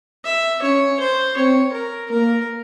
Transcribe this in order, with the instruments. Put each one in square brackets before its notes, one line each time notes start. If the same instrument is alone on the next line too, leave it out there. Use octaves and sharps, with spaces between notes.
[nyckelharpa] E5
[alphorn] C#4 [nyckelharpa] C#5
[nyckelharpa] C5
[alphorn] C4 [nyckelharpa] C#5
[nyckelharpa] A#4
[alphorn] A#3 [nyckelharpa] A#4